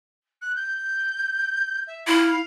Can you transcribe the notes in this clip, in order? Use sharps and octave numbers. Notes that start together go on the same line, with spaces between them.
F#6
G6
E5
E4 F5